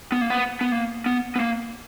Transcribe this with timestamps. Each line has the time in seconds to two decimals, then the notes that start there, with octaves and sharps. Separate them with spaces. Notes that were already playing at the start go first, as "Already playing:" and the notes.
0.12 B3
0.21 A#3
0.30 B3
0.61 B3
0.72 A#3
1.06 B3
1.36 B3
1.40 A#3